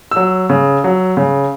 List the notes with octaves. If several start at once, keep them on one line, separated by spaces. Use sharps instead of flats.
F#3 E6
C#3
F#3
C#3